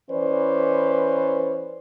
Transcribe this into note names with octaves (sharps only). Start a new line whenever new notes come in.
E3 C#4 B4 C5 D5